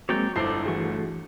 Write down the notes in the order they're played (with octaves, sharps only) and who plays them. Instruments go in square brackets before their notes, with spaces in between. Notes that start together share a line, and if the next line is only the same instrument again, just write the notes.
[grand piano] F#3 [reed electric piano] G#3 A#3 C4 [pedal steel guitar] C#5 D5 G5
[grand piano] G1 C5 C7 [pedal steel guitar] D#4 A4 D5 [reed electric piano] E4
[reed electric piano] E3 F#4 G#4 [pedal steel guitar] A3 C#6